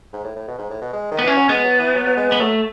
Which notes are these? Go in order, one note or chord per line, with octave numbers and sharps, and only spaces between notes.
G#2
A2
A2
B2
G#2
A2
B2
G#3
D#3
B3
E3 C#4
F#3
G#3 B3
F#3
E3
F#3
F#3
G#3
G#3 B3
F#3 A3